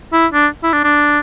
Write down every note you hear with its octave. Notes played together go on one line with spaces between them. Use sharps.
E4
D4
E4
D4
D4